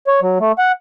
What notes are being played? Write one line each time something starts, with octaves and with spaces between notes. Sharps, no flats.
C#5
F#3
A3
F#5